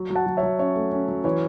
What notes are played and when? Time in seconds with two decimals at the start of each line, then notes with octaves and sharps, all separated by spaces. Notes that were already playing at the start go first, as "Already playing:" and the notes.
Already playing: F#3
0.10 F#3
0.15 F#5 A5
0.26 F#3
0.37 C#5 E5
0.43 F#3
0.59 C#4 C#5 E5
0.76 A3
0.92 C#4
1.08 F#3
1.24 E3 C#5